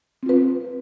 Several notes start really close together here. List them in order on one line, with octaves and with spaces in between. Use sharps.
C4 F4 B4